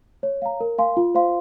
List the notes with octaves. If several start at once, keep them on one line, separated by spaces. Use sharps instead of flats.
C#5
F5 A#5
A#4
F5 G#5 C6
F4
C5 F5 C6